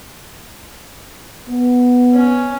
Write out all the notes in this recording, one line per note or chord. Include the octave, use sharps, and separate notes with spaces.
B3
C#4